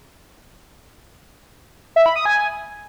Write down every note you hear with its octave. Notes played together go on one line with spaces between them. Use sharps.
E5
B5
D#6
G#5